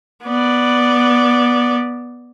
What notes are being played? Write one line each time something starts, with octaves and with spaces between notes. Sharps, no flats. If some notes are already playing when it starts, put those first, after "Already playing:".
B3 D5